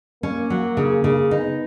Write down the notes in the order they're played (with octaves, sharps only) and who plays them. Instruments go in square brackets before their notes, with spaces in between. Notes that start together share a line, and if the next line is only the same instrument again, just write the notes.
[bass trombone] A#3 [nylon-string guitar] C#4
[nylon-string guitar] F#3
C#3
C#3
[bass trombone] B3 [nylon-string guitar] D#4